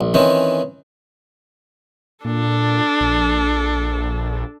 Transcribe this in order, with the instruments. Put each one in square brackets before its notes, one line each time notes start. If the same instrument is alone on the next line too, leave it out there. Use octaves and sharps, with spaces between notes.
[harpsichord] A#1
D#3 E3 C4 C#4
[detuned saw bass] A#2 [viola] D4 A4
[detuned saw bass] A#1